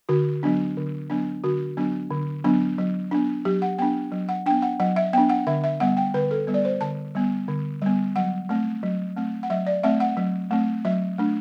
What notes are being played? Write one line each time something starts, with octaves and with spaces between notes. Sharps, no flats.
D3 F#4
F#3 B3 D4
D3
F#3 B3 D4
D3 F#4
F#3 B3 D4
D3
F#3 B3 D4
F#3
B3 D4
F#3 G4
F#5
B3 D4 G5
F#3
F#5
B3 D4 G5
F#5
F#3 F#5
E5
B3 D4 G5
F#5
D3 E5
E5
G3 B3 F#5
G5
D3 B4
A4
G3 B3
D5
C5
D3 A5
G3 B3
D3
G3 B3
F#3 F#5
A3 C4
F#3
A3 C4
F#5
F#3 E5
D5
A3 C4 E5
F#5
F#3
A3 C4
F#3 E5
A3 D4